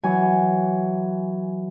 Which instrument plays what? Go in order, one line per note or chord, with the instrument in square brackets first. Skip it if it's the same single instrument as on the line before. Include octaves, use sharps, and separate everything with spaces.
[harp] E3 F#3 G#5